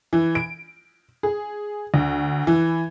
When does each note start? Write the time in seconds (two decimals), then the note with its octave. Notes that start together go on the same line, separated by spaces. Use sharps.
0.13 E3
0.35 D7
1.23 G#4
1.94 D2
2.47 E3